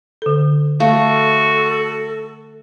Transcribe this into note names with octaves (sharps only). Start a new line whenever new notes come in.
D3 A4
A3 F#4 A4 F5